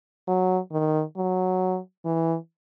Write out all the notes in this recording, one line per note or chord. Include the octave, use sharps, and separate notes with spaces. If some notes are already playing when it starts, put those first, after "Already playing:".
F#3
D#3
F#3
E3